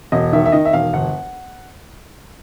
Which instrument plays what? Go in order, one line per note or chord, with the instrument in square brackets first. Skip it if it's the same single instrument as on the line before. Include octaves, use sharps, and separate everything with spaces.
[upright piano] E1 D#5
D#3 E5
E5
D#3 D#5
E5
E1 F5
G1 F#5